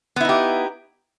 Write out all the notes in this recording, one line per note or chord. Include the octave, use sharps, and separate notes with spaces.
B3 D#4 E4 G4